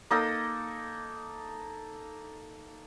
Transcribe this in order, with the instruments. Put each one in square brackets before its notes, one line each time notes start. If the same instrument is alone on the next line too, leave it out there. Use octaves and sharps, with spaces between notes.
[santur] A#3 D#4 A4 D#6